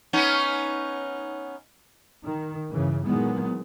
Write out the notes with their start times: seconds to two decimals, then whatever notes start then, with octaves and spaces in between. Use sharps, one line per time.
0.13 B3 C#4 D#4
2.23 D#3
2.71 G2 C#3 E3
3.04 A#2 D#3 E3 F#3 G#3 B3